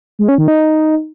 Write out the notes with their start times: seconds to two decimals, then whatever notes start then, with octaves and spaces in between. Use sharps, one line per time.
0.19 G#3
0.29 C#4
0.38 D#3
0.48 D#4